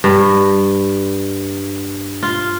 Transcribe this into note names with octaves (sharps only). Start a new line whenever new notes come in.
G2
F4